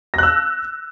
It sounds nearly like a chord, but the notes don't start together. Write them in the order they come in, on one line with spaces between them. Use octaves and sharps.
A#6 F#6 E6